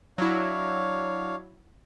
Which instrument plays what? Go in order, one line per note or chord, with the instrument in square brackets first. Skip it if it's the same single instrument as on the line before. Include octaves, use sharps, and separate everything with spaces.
[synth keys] F#3 E4 [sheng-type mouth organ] D4 C#5 F5